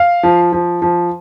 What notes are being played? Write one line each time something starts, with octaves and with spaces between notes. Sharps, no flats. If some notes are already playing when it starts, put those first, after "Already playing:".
Already playing: F5
F3
F3
F3